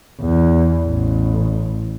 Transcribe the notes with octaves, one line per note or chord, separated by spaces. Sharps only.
E2
A1